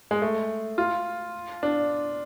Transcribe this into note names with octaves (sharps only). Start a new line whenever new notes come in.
G#3
A3
F4
D4